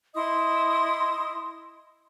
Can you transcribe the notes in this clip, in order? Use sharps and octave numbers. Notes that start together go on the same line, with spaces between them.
E4 D#5 C6 D#6